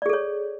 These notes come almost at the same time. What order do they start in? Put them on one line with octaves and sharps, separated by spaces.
D5 G#4 A4 C#5